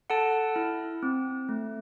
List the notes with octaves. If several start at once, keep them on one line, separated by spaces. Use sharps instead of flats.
A4 F#5 A5
E4
C4
A3